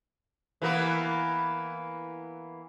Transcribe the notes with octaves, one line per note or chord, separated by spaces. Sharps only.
E3 A#3 B3